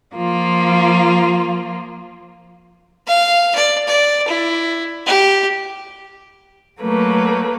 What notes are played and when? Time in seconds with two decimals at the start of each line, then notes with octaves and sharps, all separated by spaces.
0.16 F3 A#3 F4
3.07 F5
3.55 D5
3.87 D5
4.28 E4
5.06 G4
6.81 F#3 A3 A#3 B4